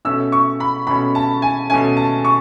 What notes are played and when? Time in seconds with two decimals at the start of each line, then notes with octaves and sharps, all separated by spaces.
0.05 B2 A3 C#4 E6
0.32 C#6
0.60 B5
0.87 B2 A3 C#4 B5
1.15 A5
1.42 G#5
1.70 B2 A3 C#4 G#5
1.97 A5
2.25 C#6